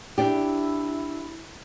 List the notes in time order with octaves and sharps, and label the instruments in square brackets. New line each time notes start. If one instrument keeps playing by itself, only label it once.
[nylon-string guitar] D4 G4 [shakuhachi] E4